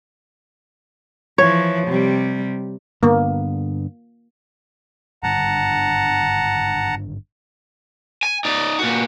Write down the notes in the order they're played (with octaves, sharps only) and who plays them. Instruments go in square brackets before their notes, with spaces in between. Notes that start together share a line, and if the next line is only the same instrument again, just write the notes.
[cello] E3 F3 [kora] C#5
[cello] C3 G3
[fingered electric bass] G2 D3 B3 [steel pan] A#3
[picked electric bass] G#1 G2 D3 [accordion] F#5 A5 A#5
[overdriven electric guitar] G#5
D#4 D5
A#2 F#4